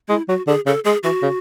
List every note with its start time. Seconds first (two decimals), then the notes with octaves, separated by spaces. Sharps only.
0.09 G#3 E4
0.28 F#3 F#4
0.47 D3 G#4
0.66 C#3 A4
0.84 G#3 G#4
1.03 E3 F#4
1.22 C#3